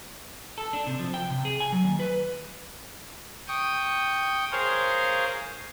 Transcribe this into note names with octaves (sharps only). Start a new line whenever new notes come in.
A4
D4
C3
F3
G5
C3
G#4
G#5
F#3
D#2
B4
G5 C#6 D#6
G#4 A#4 C5 C#5 F5